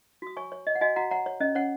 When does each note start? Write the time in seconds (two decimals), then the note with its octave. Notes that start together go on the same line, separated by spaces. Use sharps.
0.22 F#4 D#6
0.37 C#5 G#5 C#6
0.52 C#5
0.67 C#5 D#5
0.75 F#5
0.81 F#4 D#5 G#5
0.96 F#4 F#5 A#5
1.11 C#5 F#5 A#5
1.26 C#5
1.40 C#4 D#5
1.55 C#4 C#5 F#5